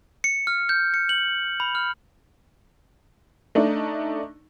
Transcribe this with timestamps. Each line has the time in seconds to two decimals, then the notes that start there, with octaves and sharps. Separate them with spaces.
0.24 C#7
0.47 F6
0.69 G6
0.94 C#7
1.09 F#7
1.60 B5
1.75 F6
3.55 A3 D4 D#4